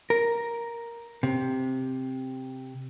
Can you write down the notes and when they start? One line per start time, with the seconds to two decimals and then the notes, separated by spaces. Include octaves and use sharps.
0.10 A#4
1.23 C3